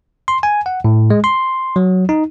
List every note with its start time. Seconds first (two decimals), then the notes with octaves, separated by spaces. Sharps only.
0.28 C6
0.43 G#5
0.66 F#5
0.84 A2
1.10 G#3
1.24 C6
1.76 F#3
2.09 D#4